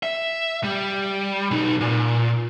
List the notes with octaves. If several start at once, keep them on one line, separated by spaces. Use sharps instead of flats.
E5
G3
B1 D#4
A#2